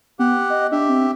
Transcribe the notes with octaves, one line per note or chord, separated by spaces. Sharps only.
B3 G4 F#5
D#5
D4 G4 E5
C4